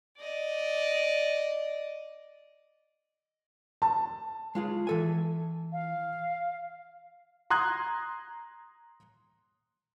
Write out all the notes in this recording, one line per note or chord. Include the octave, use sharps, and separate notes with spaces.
D5 D#5
A5
G#3 F4 G#4
E3 A4 G#5
F5
A#5 C6 D#6 F#6 G#6